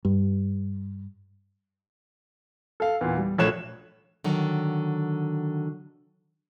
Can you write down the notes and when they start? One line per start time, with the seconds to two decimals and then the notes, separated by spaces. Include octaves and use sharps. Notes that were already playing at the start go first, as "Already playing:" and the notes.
0.05 G2
2.80 A4 F5
3.01 E2 A#2
3.18 G3
3.38 A#1 A3 C#5 C#6 F#6 E7
4.24 D3 D#3 F#3